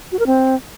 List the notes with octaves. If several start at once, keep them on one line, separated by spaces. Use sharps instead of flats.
F#4
A#4
C4